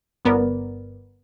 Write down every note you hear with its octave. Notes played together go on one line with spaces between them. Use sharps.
G1 B3 A#4 D5